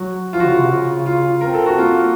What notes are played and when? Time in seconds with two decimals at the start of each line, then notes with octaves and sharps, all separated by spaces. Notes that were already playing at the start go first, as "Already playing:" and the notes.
Already playing: F#3 F#4
0.33 F3 F4
0.40 F#4
0.46 C#3 F4
0.57 C3
0.70 C#3
1.06 F4
1.41 C4 A#4
1.54 A4
1.66 F#4
1.78 A#3 F4